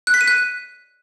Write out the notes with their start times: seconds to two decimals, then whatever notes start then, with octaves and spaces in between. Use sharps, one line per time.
0.07 F#6
0.14 B6
0.21 D#7
0.27 F#6